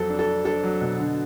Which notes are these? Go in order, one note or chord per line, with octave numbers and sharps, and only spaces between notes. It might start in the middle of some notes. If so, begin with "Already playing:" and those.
Already playing: F2 F#3 A4
D4
A4
D4
D4 A4
F#3
B2
D3